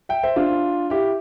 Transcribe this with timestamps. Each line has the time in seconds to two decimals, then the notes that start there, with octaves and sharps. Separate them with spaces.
0.09 E5 G5
0.23 C5 E5
0.36 D4 F4
0.90 E4 G4